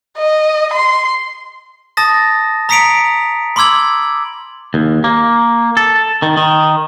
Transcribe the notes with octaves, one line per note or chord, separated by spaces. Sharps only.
D#5
C6
A5 D#6 A6 A#6
A#5 D#6 B6 C#7 D7 F7
B5 C6 D6 E6 G#6 F#7
D#2
A#3
A4
D#3
D#3